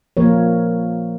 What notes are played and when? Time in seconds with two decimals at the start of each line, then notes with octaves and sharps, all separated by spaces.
0.17 F3 A#3 A#4 C#5